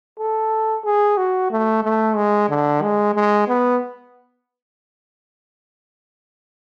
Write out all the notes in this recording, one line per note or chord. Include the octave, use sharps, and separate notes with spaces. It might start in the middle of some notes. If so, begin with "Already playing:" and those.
A4
G#4
F#4
A3
A3
G#3
D3
G#3
G#3
B3